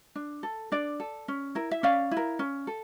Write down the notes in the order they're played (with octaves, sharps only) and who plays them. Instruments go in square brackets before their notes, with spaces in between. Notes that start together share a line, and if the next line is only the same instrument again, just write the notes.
[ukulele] D4
A4
D4 D5
A4
C#4
E4 A#4
E5
C#4 D5 F5
E4
A#4
C#4
A4